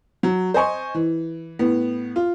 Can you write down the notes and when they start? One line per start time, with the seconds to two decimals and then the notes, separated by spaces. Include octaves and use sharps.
0.23 F#3
0.54 C5 D#5 G#5 C#6
0.95 E3
1.59 A2 B3
2.16 F4